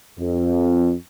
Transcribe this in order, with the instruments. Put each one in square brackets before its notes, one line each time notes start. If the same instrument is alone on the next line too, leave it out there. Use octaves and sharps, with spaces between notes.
[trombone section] F2